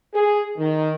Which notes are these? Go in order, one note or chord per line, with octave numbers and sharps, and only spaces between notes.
G#4
D#3